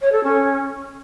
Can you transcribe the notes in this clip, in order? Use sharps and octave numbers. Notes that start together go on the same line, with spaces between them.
C#5
A4
C#4